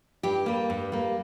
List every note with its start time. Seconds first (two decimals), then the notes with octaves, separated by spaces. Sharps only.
0.23 G2 G4
0.46 G3 A#3
0.70 G2
0.92 G3 A#3